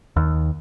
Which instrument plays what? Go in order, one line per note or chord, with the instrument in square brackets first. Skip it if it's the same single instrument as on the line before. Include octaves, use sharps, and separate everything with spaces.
[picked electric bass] D#2